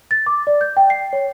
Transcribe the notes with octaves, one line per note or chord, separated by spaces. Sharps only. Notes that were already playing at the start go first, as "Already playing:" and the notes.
A6
D6
D5
G6
G5
C7
C#5